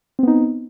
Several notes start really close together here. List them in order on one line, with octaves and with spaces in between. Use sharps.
C4 B3 D#4